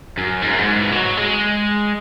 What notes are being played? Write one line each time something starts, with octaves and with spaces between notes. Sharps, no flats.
F#2
G#2
F#2
G#2
E3
F#3
G#3